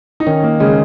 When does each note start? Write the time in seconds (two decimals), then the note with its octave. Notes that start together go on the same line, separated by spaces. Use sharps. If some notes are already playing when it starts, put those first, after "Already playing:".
0.20 D#4
0.26 D#3 C#4
0.44 A#3
0.60 C#3 G#3